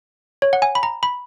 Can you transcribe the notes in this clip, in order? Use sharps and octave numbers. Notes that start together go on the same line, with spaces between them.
C#5
F#5
G#5
B5
A#5
B5